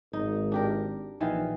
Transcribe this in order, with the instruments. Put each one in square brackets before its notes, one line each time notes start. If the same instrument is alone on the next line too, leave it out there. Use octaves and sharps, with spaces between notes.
[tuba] G#1 [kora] D#4
[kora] D4 G4 A#4
[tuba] A#1 [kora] D#3 E3 F5